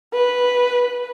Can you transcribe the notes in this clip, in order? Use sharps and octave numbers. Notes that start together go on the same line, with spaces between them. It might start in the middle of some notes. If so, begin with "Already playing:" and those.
B4